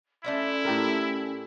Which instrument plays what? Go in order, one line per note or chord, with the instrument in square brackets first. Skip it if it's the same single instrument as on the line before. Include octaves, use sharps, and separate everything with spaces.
[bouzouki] A3 D4 F4 [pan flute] C#4 [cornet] E4
[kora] A2 G4 A#4